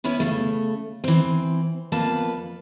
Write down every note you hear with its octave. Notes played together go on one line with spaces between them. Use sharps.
B3 C#4 E4 B4
C#3 A3
E3 C4
F2 A#3 B3 B4 A5